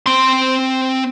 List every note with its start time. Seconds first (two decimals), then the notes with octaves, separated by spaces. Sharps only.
0.06 C4 C6